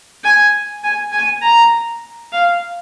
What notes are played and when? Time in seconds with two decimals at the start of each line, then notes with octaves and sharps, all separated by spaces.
0.24 G#5
0.84 G#5
1.12 G#5
1.42 A#5
2.32 F5